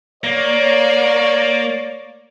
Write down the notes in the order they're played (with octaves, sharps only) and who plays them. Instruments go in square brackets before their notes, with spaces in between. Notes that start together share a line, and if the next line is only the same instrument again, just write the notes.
[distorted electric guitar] A#3 [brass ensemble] C#5 D5